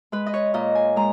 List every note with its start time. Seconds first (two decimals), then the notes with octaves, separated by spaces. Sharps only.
0.12 G#3 B4
0.26 D#5
0.34 C#5
0.54 A#2 D#5
0.75 G#5
0.96 G#3 A#5